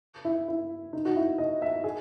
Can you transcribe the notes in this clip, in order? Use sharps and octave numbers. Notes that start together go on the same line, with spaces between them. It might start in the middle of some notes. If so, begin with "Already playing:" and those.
E4
E4
D#4
F#4
E4
D#5
E5
G#4